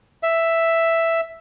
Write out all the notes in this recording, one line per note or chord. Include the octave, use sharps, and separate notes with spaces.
E5